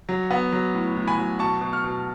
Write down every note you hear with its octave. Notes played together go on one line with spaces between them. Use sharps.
F#3
B3
F#3
A2
A2
G#5 B5
F#3
B2 A5 C#6
B2
C#6 F6
B2